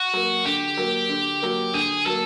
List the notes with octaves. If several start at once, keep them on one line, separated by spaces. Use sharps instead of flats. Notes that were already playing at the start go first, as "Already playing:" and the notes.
Already playing: F#4
F#3 A#3
D3 G4
F#3 A#3
D3
F#3 A#3
D3 G#4
F#3 A#3 A4